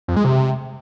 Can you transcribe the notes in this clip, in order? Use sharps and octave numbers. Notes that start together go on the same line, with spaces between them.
F2
G#3
C3